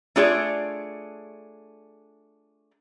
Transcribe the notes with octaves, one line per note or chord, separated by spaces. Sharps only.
A3 D4 F4 G#4 C#5 D5